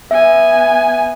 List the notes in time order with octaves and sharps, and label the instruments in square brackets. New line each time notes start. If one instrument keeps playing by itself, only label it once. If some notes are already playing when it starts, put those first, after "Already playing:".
[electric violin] B3 G#5 [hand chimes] E5